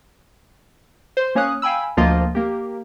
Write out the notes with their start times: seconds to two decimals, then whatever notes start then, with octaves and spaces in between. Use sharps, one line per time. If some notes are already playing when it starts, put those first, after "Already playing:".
1.17 C5
1.35 A#3 C#4 C#5 F5 D#6 F#6
1.62 F5 G5 G#5 B5 E6
1.97 D2 F3 A#3 F4 D#5
2.35 A#3 G4